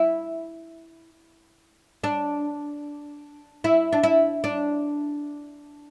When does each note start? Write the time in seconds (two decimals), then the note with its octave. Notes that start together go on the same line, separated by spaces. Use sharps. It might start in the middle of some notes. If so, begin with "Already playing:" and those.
Already playing: E4
2.04 D4
3.64 E4
3.93 D4
4.03 E4
4.44 D4